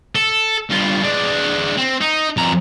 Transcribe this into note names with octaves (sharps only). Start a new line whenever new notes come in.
A4
G2 F4
G#3 D4
C4
D#4
F2 A#5